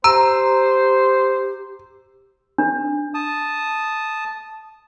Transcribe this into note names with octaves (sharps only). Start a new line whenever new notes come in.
G4 C5 A#5 E6
D4
A5 D#6